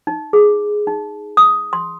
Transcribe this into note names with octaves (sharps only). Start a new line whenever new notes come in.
D#4
G#4
D#4
D#6
C6